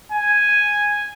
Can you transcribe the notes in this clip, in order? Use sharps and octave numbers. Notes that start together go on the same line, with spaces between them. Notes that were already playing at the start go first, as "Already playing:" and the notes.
G#5